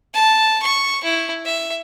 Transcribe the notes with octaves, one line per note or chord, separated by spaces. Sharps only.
A5
C#6
E4
E5